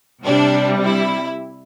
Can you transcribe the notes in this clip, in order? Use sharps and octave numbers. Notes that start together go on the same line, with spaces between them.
C3 G3 D4
E4